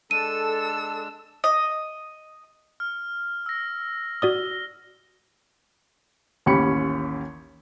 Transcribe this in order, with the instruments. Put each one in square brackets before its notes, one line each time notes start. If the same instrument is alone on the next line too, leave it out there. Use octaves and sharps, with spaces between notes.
[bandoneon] G#3 D4 [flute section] A4 [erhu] E6 [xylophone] D#7
[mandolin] D#5
[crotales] F6
E6 A#6
[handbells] F#4 D5 D#6 [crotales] G7
[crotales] A#6
[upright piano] A1 D#2 C#4 G4 B5 C#7